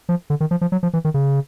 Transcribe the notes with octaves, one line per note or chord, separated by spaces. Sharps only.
F3
D3
D#3
F3
F3
F#3
F3
E3
D#3
C#3